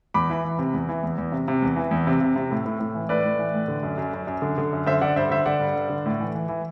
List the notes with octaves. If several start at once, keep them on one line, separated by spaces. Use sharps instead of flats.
E2 B5 D6
E3
E3
C3
E2
E3
E2
E2
C3
C3
E2
E3
E2
C3
C3
C3
A2
A2
A2
E3
A2 B4 D5
A2
E3
A2
D3
F#2
F#2
F#2
F#2
D3
D3
F#2
D3 C5 E5
D3 D5 F#5
G2 C5 E5
D3 C5 E5
D3 D5 F#5
G2
G2
D3
A2
E3
E3
E3